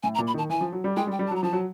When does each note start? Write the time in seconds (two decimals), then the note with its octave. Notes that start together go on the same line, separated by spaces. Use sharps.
0.03 A2 G#5
0.15 A#5
0.19 A#2
0.27 B5
0.34 D#3 A5
0.50 E3 G#5
0.61 F3
0.72 F#3
0.84 G3
0.97 G#3 G5
1.07 G3
1.12 G5
1.19 G3
1.27 A5
1.31 F#3
1.36 A#5
1.43 F3 A5
1.53 F#3